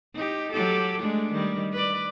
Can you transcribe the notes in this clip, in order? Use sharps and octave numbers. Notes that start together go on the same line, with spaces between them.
D#4 G4
F#3 G4 A4
G#3 A3 D4
D#3 G3
B4 D5